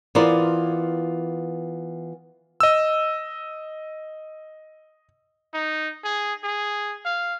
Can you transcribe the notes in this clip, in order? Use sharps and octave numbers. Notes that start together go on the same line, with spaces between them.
E3 B3 F4 A#4 C5 D5
D#5 E6
D#4
G#4
G#4
F5